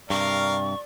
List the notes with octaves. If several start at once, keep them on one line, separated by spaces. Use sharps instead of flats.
G2 C3 A#4 D5 F5 C#6